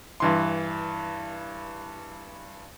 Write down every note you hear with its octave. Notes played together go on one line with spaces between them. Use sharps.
G2 E3 C6